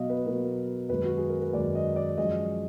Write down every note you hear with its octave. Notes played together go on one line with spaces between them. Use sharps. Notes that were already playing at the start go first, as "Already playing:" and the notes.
Already playing: B2 F#3 D#5 F5
B4
B2 F#3 A#4
F#2 D#3 G#3 B4
F#4
G#4
A#4
B4
F#2 D#3 G#3 D5
D#5
D5
F#2 F3 G#3 D#5